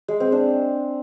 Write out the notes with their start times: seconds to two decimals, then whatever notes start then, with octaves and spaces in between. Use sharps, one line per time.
0.08 G#3
0.20 C4
0.32 D4